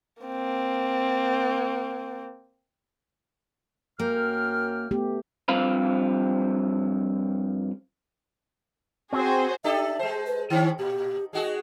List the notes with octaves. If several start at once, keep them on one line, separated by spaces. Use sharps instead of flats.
A#3 C4
F#2 A#3 G5 F6
A3 B3 G4
G2 F3 C4 F5 B5
C4 F#4 G#4 C5
D4 G4 A4 E5
G#3 C5
B4
D#3 C4 C#4 E4
A#2 G4
G#3 F#4 G#4 D#5